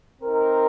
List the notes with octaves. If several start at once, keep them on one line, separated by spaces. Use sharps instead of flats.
C4 D#4 A#4